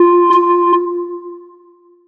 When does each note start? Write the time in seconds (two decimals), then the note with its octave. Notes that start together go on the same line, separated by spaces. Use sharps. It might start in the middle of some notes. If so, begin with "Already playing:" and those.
Already playing: F4
0.34 F4